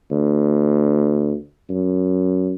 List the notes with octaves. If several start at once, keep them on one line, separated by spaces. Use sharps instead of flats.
D2
F#2